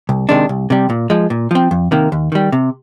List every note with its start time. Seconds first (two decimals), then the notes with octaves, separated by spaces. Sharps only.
0.09 C2
0.29 C3 D#3 G#3 D4
0.49 C2
0.70 C3 G3
0.90 A#2
1.10 F3 G#3
1.30 A#2
1.51 F3 C4
1.71 F2
1.91 C3 D#3 A#3
2.12 D#2
2.32 D#3 G3
2.52 C3